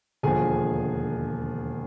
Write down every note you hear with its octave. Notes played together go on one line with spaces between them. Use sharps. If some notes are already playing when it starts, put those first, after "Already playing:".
E1 D#2 D3 F3 G#4 G#5